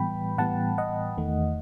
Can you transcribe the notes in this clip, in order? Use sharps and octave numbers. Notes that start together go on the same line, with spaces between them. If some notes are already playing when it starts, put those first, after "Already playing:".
Already playing: A2 E3 G3 B3 G5 B5
A2 E3 G3 B3 F#5 A5
D#5 F#5
E2 D#3 A3